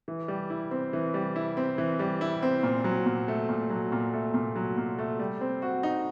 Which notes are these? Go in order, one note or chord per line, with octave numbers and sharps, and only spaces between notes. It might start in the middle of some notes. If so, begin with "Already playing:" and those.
E3
G3
E4
C4
E3
G3
E4
C4
E3
G3
E4
C4
A#2
F#3
A#2
A3
A#2
F#3
A#2
A3
A#2
F#3
A#2
A3
G3
C4
F#4
D#4